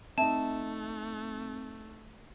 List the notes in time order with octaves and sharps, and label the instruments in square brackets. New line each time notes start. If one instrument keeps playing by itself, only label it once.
[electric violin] A3 [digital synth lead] C4 [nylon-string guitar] D#4 E5 [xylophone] A5